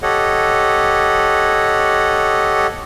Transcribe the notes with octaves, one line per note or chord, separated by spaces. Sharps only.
G4 A4 C#5 D#5 F#5